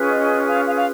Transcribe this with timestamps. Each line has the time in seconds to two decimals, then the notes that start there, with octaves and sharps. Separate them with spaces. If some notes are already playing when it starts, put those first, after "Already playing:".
Already playing: C#4 F4 G#4 B4
0.09 D#5
0.47 F5
0.65 F5
0.76 F5